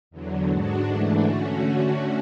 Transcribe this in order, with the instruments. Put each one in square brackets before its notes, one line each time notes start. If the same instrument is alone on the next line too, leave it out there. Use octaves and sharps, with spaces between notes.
[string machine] E2 D3 F#3
G#2 G#3 D4 F#4
G#2 E3 A3 D4
D3 A3 C#4 F#4